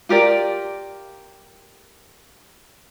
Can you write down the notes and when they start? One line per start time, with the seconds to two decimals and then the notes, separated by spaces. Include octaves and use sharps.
0.09 F4 G4 A#4 D5